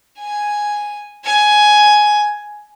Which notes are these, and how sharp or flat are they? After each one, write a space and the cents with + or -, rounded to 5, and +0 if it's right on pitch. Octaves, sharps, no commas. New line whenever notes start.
G#5 +0
G#5 +10